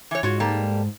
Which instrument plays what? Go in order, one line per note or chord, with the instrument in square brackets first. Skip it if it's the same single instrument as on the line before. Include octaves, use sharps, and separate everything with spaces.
[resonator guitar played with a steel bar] E3 C#5
[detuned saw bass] G#2 [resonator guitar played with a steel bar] F4 F#4 C#5
[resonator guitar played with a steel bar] G3 A#3 A4